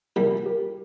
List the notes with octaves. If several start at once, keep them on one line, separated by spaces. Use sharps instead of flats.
C2 A#2 G3 G4 A#4
G4 A#4